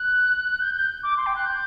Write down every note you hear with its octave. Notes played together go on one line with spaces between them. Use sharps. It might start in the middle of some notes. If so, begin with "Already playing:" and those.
Already playing: F#6
G6
G6
D6
C6
G5
F#6
G6